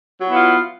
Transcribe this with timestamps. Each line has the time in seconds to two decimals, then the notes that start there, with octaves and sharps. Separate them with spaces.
0.21 F#3
0.25 E4
0.29 B3
0.33 F4